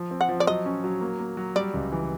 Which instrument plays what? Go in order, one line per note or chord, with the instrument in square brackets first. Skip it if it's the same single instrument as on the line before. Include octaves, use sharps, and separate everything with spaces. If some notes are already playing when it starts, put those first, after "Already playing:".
Already playing: [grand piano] F3
C4
[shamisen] F#5
[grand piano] F3
[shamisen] D5
[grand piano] F#3 [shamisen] D#5
[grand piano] C#4
F#3
A#3
A#3
F#3
[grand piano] G3 [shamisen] D5
[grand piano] C#2
E3